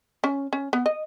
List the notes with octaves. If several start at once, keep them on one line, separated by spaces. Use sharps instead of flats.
C#4
C#4
B3
D#5